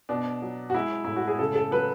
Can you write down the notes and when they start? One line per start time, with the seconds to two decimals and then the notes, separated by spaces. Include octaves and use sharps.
0.09 B2 D4
0.42 F#3
0.70 F#4
0.74 G#3 E4
1.04 A2 E4
1.16 F#4
1.28 G#4
1.39 C#3 A4
1.55 A4
1.71 F#3 B4